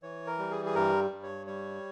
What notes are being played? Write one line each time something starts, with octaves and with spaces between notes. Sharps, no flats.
E3 C#5
A#4
G3
G#4
G#4
G2 A#4
G2
C#5
G3 C#5